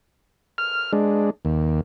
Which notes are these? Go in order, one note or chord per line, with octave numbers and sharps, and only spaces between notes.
F6
G#3 D4
D#2